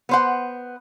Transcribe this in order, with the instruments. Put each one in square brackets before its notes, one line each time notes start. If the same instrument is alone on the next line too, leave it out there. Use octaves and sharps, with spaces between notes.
[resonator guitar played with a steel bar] B3 C5 F#5